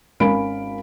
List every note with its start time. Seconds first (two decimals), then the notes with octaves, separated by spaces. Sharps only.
0.20 G#1 C#4 A#4 F5 B5 D7